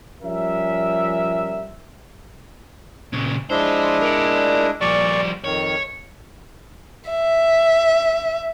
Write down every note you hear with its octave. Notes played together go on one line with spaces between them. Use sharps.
F3 G3 C#4 A#4 E5
A#2 C#3
F3 G#3 D4 E4 C5
A#4 D5
A#2 F3 G3 D5 C#6
F2 D#3 C#5
E5